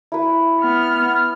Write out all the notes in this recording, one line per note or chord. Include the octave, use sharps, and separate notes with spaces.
E4 B4
B3 F6